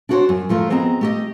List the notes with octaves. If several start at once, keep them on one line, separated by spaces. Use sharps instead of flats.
D4 E4 F#4 G#4 C5 C#5
F#2
F3 A3 F4 A#4
B3 C4 G#4 D#5 A#5
A3 G4 D#5